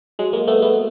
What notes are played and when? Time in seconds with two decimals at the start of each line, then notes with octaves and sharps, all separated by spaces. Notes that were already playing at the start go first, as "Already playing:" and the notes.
0.19 F#3 G#3
0.33 G#3 A#3
0.47 A3 B3
0.62 A3 B3